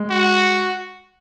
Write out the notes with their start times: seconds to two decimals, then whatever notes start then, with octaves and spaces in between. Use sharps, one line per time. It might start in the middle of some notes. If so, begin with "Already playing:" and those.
Already playing: G#3
0.11 F#4